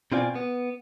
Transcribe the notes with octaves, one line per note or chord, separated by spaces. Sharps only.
B2 C4 F4 D5 G#5
B3